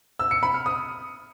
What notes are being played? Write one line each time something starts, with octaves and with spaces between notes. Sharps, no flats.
E6
C#7
B5
F6
D#6